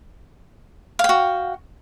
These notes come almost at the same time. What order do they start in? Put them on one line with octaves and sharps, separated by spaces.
F5 G5 F#4